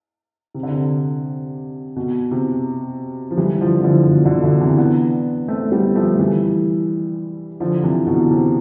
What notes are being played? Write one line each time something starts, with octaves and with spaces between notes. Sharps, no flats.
C3
D3
C3
B2
C3
F3
E3 G3
D3 F3
E3
D3 F3
B2 D3
B2 D3
B2 D3
C3 E3
B3 D4
A3 C4
G3 B3
F3 A3
E3 G3
D3 F3
C3 E3
B2 D3
C3